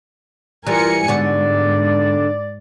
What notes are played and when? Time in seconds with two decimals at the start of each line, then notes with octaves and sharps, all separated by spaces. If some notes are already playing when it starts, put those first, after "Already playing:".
0.67 E3 G3 F4 A#4 G#5 C#7
1.08 G#2 D3 B3 F#4 D5